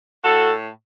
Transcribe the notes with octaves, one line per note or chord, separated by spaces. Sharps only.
A2 F#4 A4